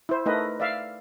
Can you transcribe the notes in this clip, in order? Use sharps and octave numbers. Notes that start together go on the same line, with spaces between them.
E4 C5
A3 D#4 A#4 B4 D#5
D5 E5 F5